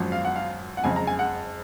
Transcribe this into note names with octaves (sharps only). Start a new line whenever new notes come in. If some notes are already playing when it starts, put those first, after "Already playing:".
Already playing: G#1 F#2 F3
F5
F#5
F5
F#5
F#1 F2 C#3 G#3 G#5
A#5
G#5
F#5